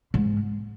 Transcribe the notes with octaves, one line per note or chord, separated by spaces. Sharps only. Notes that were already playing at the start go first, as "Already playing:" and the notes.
G#2